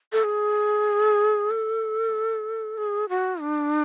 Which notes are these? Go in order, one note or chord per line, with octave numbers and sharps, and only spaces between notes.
A4
G#4
A4
G#4
F#4
D4